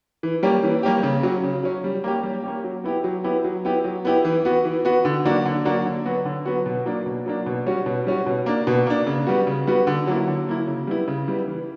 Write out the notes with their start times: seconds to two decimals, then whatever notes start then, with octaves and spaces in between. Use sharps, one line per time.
0.23 E3
0.43 G3 A#3 C#4 G4
0.63 E3
0.83 G3 A#3 C#4 G4
1.03 C#3
1.23 F#3 C#4
1.44 C#3
1.63 F#3 C#4
1.84 G3
2.04 A#3 C#4 G4
2.23 G3
2.43 A#3 C#4 G4
2.64 F#3
2.84 B3 E4 G4
3.04 F#3
3.24 B3 E4 G4
3.44 F#3
3.65 B3 E4 G4
3.84 F#3
4.05 B3 E4 G4
4.25 E3
4.45 B3 F#4
4.65 E3
4.85 B3 F#4
5.05 D3
5.25 F#3 A#3 D4 F#4
5.45 D3
5.65 F#3 A#3 D4 F#4
5.86 D3
6.06 F#3 B3 F#4
6.25 D3
6.46 F#3 B3 F#4
6.66 B2
6.86 F#3 A#3 D4
7.06 B2
7.26 F#3 A#3 D4
7.46 B2
7.66 G3 C#4 F#4
7.86 B2
8.07 G3 C#4 F#4
8.26 B2
8.46 A#3 D4
8.67 B2
8.86 A#3 D4
9.07 C#3
9.27 G3 B3 F#4
9.47 C#3
9.67 G3 B3 F#4
9.87 D3
10.07 F#3 A#3 E4
10.27 D3
10.47 F#3 A#3 E4
10.67 C#3
10.87 G3 B3 E4
11.08 C#3
11.27 G3 B3 E4
11.47 E3